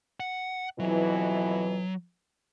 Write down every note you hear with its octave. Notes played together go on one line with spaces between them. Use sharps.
F#5
F2 B2 E3 F#3